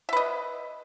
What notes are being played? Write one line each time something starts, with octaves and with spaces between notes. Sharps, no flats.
B4 D#5 E5